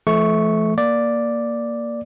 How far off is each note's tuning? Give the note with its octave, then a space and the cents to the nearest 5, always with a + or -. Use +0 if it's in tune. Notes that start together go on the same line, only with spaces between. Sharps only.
E3 +45 A3 -25 C#6 +0
A#3 +0 D5 +0